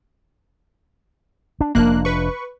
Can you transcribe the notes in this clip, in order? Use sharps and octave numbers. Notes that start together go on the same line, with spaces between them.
D4
F1 F3 A#3 D4 F#6
B4 C#6